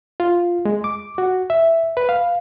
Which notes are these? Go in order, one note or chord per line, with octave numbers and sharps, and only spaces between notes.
F4
G#3
D6
F#4
E5
B4
F5